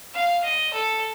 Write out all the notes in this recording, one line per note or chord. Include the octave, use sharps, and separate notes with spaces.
F5
D#5
A4